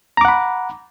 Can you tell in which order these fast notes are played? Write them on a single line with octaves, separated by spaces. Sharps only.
A#5 D6 F#5 B5